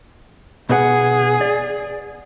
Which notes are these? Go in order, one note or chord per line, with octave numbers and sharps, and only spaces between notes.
B2 G#4 B4 F#5
D5